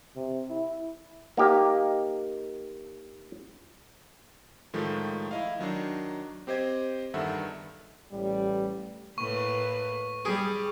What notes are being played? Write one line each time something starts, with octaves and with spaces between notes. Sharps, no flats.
C3
E4
A#3 D#4 G4
A2 D#3 F3 G#3 A3
E4 D#5 F5
D#3 F#3 D4 D#4
C4 G4 C5 D#5 G#6
E2 G2 D#3 A4 E5 F#5
A1 G3
A2 A#3 B4 C#6
G3 G#4